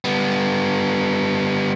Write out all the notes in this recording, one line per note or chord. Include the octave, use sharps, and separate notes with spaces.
G3 B3